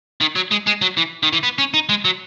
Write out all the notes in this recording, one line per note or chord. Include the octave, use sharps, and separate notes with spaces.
D#3
F#3
G#3
G#3
F#3
E3
D#3
E3
B3
C#4
D#4
G#3
F#3